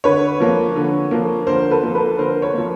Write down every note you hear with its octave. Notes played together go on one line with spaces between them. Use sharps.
D3 B4 C#5
F3 A#3
D3
F3 A#3
D3 A#4 C5
A4 B4
F3 A#3
A4 B4
D3 A#4 C5
B4 C#5
F3 A#3